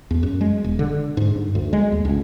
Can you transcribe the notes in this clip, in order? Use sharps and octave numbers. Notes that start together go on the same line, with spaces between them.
E2
F#2
G#3
E1
D3
G#2
G2
D2
G#3
D#2
C#2